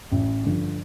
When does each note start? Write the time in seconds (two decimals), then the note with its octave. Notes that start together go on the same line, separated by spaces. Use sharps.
0.12 A1
0.44 G2 D3 F3